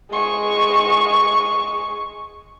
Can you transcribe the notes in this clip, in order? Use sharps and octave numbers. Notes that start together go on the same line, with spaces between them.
G#3 C#6